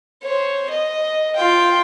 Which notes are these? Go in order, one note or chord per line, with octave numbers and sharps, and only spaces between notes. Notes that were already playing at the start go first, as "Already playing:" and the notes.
C5 C#5
D#5
F4 G5